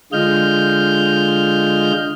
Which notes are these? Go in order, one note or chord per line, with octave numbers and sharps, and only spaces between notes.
D3 G#3 F4 D#5 F6 G6